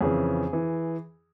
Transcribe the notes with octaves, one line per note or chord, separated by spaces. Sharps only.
F2 C#3 E3 G#4
E3